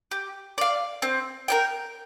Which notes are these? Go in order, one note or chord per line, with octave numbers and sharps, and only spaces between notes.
G4
D5 F5
C4
A#4 D5 G5